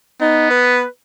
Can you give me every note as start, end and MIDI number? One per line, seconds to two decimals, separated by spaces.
0.21 0.85 59
0.21 0.49 63
0.50 0.86 71